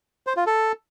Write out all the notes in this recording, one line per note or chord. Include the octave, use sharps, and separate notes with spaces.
C5
F4
A4